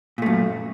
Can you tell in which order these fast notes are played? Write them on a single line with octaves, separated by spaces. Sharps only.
A#2 A3 F#2